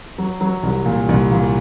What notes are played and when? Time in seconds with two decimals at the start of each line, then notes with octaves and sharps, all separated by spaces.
0.18 F#3
0.41 F#3
0.63 C2
0.86 A#2
1.09 C2
1.31 A#2